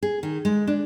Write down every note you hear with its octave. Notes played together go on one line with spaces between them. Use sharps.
G#4
D#3
G#3
D4